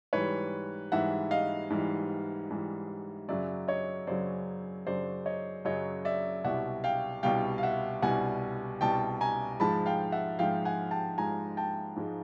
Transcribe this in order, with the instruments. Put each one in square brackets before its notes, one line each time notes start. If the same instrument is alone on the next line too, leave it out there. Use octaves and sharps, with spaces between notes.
[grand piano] G#2 E3 G3 B4 C#5
G#2 E3 G3 E5 F#5
D#5 F5
G#2 E3 G3
G#2 E3 G3
F#2 C#3 F#3 D5 E5
C#5 D#5
F#2 C#3 F#3 C5 D5
F#2 C#3 F#3 C5 D5
C#5 D#5
F#2 C#3 F#3 C#5 D#5
D5 E5
C2 B2 G3 E5 F#5
F5 G5
C2 B2 G3 F5 G5
F5
E5 F#5
C2 B2 G3 F#5 G#5
C2 B2 G3 G5 A5
G#5 A#5
G#2 F3 G#3 A5 B5
F5 G5
E5 F#5
G#2 F3 G#3 F5 G5
F#5 G#5
G5 A5
G#2 F3 G#3 G#5 A#5
G5 A5
G#2 F3 G#3